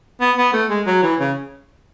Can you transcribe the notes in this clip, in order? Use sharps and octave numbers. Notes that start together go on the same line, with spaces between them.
B3
B3
A3
G#3
F#3
E3
C#3